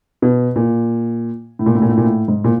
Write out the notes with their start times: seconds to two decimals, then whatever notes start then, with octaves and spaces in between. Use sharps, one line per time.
0.22 B2
0.56 A#2
1.59 A2
1.66 A#2
1.75 A2
1.82 A#2
1.89 A2
1.98 A#2
2.04 A2
2.28 G#2
2.44 A#2